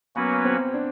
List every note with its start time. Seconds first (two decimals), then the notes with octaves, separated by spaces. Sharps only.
0.16 F#3 A#3 B3 C#4 F#4 B4
0.45 C4
0.74 D4